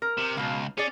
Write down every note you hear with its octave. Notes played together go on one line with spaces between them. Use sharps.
A#4
C3
C#2 B2 F5
C#4 G#4 D5